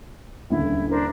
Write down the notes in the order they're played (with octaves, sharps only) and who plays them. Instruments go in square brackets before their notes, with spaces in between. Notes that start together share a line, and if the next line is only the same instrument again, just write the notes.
[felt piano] D#1 C#2 D3 [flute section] E4
[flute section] D4 A#4 C5